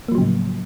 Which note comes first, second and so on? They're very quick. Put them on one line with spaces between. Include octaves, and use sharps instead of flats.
A#3 F3 F#3 C#3 A2